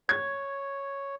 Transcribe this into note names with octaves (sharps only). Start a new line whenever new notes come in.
C#5 G#6